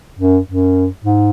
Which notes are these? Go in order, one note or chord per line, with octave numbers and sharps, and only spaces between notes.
F#2
F#2
G#2